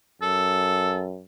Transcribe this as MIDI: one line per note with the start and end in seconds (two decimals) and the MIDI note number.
0.22 1.24 42
0.22 1.02 69